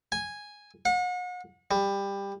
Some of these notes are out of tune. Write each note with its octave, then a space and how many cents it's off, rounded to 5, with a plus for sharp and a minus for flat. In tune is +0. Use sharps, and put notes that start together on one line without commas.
G#5 -5
F#5 -40
G3 +20